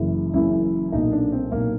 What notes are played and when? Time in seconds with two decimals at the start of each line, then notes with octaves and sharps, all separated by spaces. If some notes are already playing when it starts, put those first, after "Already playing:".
Already playing: F#1 F#2 C#3 E3 E4
0.33 F#1 F#2 C#3 E3 E4
0.92 B1 A#2 D#4
1.12 D4
1.32 C4
1.51 B1 A#2 A#3